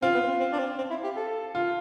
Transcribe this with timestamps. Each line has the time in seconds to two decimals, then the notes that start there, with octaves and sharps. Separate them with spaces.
0.02 C4 F4
0.14 B3
0.27 C4
0.40 C4
0.52 D4
0.59 C4
0.78 C4
0.90 E4
1.04 G4
1.16 A4
1.55 F4